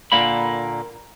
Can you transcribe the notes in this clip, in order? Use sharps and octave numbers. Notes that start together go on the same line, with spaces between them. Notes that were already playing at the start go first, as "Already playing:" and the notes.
A#2 D3 A#3 B5